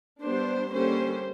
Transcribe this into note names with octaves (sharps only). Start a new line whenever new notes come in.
G3 B3 D4 C5
D3 G3 A#3 C#4 C5